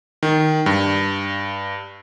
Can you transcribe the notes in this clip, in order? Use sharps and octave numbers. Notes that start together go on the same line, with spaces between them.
D#3
G2